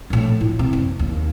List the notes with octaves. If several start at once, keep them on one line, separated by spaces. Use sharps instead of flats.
A#1 A2
E4 F4
C3
F#1
D#2